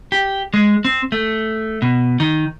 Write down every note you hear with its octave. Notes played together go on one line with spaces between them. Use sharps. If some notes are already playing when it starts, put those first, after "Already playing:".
G4
G#3
C4
A3
B2
D#3